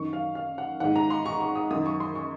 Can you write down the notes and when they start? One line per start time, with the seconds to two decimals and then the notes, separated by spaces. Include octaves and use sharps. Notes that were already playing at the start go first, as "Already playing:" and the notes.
Already playing: F#2 D#3 C#6
0.13 F5
0.35 F5
0.58 F#5
0.80 G#2 D#3 F#5
0.96 A#5
1.10 C6
1.26 C#6
1.40 C#6
1.55 D#6
1.70 F#2 D#3 D#6
1.86 C#6
2.00 C6
2.15 C#6